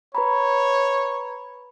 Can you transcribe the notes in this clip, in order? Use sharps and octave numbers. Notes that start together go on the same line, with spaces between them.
B4 C#5 A#5 B5